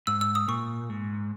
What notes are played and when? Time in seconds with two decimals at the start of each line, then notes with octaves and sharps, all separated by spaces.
0.07 G#2 E6
0.21 E6
0.35 D#6
0.48 A#2 C#6
0.90 G#2